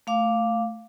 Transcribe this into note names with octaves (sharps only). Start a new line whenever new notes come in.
A3 F5 D6